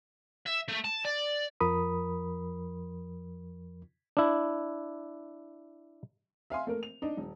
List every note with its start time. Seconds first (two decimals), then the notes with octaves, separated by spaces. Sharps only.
0.46 E5
0.68 A3
0.84 A5
1.05 D5
1.60 F2 F3 A#4 B5 D#6
4.17 D4 E4
6.50 E5 F5 G#5 C6
6.67 A3 A#3 A#4
6.83 F7
7.02 D4 D#4
7.17 D#1